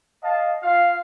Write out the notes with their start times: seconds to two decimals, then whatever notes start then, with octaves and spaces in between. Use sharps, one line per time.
0.22 D#5 F5 A5
0.62 F4 F5